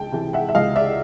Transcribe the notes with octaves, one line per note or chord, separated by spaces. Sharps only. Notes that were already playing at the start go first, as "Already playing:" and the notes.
Already playing: C#2 G5 A5
C3 E3
E5 F#5
E5
C#2 D#5 F5
D5 E5